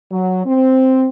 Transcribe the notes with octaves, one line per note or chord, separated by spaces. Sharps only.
F#3
C4